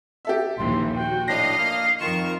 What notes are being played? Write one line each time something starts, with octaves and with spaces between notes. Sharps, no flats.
G4 A4 E5
A#1 D#2 E3 C6
F#4 G5
A2 D4 D#5 F5 A#6 C7
A#3 F6
F2 D#3 F4 A#4 C#6 E7